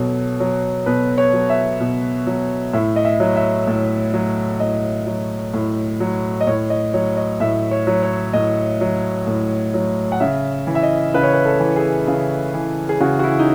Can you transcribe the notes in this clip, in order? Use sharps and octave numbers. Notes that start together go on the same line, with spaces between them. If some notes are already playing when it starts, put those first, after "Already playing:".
Already playing: B2 F#3 A4
F#3
B2 B4
C#5
F#3
E5
B2
F#3
A2 E5
D#5
E5
F#3
E5
A2
F#3
A2 D#5
F#3
A2
F#3
D#5
A2 C#5
D#5
F#3 C#5
D#5
A2 E5
C#5
F#3
C#5
A2 D#5
F#3
A2
F#3
F#5
C#3 E5
E3
E5
D#5
C#3 B4
C#5
B4
A4
E3
G#4
C#3
E3
G#4
C#3 F#4
F#4
E4
D#4